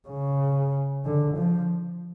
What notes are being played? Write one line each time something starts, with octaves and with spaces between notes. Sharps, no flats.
C#3
D3
F3